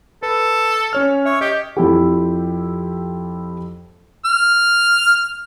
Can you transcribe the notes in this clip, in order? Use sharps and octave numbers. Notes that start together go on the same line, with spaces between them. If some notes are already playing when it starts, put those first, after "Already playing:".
A4 B4
C#4 C#5 F6
C#5 E5
G4 D#5 G6
F2 E4 G4
F6